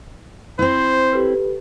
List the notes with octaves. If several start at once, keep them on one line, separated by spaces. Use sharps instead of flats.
C4 E4 C5
G4 A4 B4